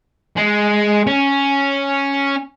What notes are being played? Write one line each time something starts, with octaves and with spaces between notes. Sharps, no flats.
G#3
C#4